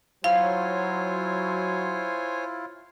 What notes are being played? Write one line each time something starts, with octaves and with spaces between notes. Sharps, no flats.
F#3 E4 F4 C5 C#5 F5 G#5